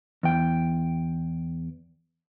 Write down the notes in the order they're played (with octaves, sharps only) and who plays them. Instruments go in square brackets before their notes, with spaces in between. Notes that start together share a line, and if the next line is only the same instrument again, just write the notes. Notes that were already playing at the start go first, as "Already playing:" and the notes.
[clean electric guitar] E2 G5